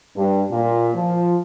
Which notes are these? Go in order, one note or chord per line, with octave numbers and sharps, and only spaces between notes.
G2
A#2
F3